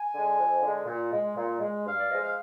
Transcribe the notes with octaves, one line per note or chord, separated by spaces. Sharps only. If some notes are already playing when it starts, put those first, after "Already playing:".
Already playing: G#5
D3 G#3
F2
D3 G#3
A#2
G#3
A#2
G#3
G2 F5
D5
F3 G#3 D#5
F5